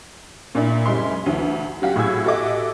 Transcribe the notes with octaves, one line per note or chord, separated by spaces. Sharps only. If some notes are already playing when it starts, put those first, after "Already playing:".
A#2 D4 E4
F#1 G3 G#3 C#4 E4 C6
D2 E3
F#3 C#4 F#4 G4 F5
A2 F#4 G#4 E6 G#6
F#4 G4 A4 D#5 E5 D6